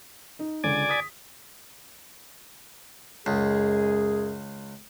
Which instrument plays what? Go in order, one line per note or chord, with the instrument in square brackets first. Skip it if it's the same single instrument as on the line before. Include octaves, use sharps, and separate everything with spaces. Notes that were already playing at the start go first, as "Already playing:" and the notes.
[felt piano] D#4
[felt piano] C#2 D3 [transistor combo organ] D5 G#5
[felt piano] D#6 B6
[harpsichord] C#2 [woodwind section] F#2 G#3 G#4